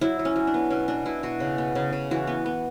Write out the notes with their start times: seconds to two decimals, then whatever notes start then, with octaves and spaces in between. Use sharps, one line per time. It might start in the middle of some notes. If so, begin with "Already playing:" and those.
0.01 F#3 E4
0.19 F#3
0.25 C#4
0.36 F#3
0.47 D4
0.54 B3
0.70 B2 C#4
0.88 B2 D4
1.06 B2 E4
1.23 B2 F#4
1.40 C#3
1.58 B3
1.75 C#3
1.93 C#3
2.11 E3 F#4
2.27 B3
2.46 B3